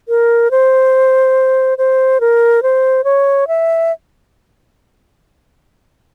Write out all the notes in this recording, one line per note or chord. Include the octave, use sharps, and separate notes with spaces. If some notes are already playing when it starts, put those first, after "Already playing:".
A#4
C5
C5
A#4
C5
C#5
E5